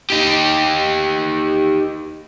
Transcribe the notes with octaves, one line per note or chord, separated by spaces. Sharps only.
D#4 G4